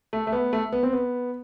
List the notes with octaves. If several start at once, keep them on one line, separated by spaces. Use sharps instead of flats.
A3
A3
B3
A3
B3
C4
B3